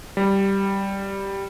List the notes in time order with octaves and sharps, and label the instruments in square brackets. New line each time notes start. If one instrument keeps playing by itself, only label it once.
[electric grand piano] G3